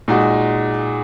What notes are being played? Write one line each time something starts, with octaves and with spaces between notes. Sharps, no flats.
A#2 G#3 D#4 F#4